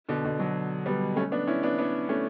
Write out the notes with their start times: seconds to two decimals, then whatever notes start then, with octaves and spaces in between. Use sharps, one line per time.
0.09 B2 D3
0.25 B2 D3
0.39 D3 F#3
0.86 G3 B3
1.16 A3 C#4
1.32 B3 D4
1.47 C#4 E4
1.63 B3 D4
1.78 B3 D4
2.09 A3 C#4